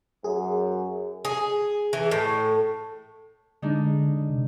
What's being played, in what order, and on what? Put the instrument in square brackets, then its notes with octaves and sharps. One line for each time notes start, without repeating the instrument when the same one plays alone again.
[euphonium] F#2 [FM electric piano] G#4
[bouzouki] G#4
E3
A2
[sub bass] D3 [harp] G#3 D4 D#4
[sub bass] C3